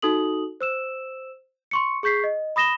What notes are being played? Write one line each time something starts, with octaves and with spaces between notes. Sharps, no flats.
D#4 F#4 A4 D#6 F#7
C5 E6 E7
C6 C#6 C#7
G#4 C#6 G6 B6 C7
D#5
B5 D#6 A#6 E7 G7